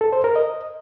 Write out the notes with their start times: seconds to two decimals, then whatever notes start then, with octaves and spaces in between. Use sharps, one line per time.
0.01 A4
0.13 C5
0.24 A#4
0.36 D#5